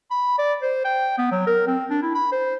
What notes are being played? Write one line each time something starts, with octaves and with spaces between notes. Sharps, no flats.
B5
D5
C5
G5
B3
F#3
A#4
C4
D4
E4
B5
C5